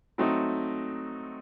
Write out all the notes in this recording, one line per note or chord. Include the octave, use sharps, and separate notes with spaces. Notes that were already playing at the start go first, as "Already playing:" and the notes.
F#3 A3 C4 D#4